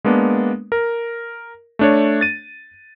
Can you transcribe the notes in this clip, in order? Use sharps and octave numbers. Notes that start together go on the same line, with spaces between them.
G#3 A#3 B3 D4
A#4
A3 D4 C#5
A6 D#7